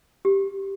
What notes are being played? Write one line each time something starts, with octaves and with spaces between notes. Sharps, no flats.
G4